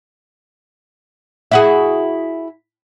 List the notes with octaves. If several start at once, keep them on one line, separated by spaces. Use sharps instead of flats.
E4 F#4 G#4